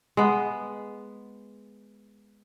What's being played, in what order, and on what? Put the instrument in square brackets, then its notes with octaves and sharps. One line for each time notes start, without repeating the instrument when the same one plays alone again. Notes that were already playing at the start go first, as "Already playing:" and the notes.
[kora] G#3 B3